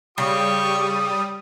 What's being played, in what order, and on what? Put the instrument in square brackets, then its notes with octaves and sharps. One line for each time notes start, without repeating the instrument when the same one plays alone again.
[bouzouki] C#3 [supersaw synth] G3 [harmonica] G4 C#6 [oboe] D#6